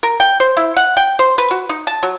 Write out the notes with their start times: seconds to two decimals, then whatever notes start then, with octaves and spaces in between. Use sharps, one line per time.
0.03 A#4
0.20 G5
0.40 C5
0.57 E4
0.77 F#5
0.97 G5
1.19 C5
1.38 B4
1.51 F#4
1.69 D#4
1.87 A5
2.03 F#3